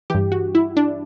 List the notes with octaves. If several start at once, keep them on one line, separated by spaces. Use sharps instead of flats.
G2 E3 G4
F#4
E4
D4